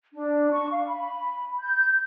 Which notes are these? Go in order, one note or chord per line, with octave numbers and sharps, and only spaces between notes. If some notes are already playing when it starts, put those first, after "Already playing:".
D4
C#6
F5
B5
G6